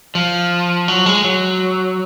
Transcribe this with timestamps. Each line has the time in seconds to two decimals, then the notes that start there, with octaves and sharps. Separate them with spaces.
0.15 F3
0.88 F#3
1.06 G#3
1.24 F#3